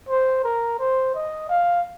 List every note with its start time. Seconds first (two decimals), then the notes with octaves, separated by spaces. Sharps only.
0.09 C5
0.44 A#4
0.79 C5
1.15 D#5
1.49 F5